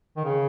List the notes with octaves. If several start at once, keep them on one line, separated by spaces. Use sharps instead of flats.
D#3
C#3